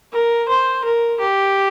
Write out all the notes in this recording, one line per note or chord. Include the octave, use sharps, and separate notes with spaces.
A#4
C5
A#4
G4